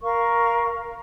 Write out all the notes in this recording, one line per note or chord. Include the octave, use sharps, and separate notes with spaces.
A#4 F5 C#6